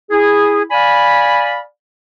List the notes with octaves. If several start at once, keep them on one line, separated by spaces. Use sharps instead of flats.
E4 G#4
D5 F5 G#5 B5